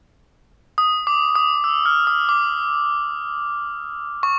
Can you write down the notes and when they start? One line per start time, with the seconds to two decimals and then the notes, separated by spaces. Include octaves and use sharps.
0.78 D#6
1.07 D6
1.35 D#6
1.64 E6
1.86 F6
2.07 D#6
2.29 D6
4.23 C#6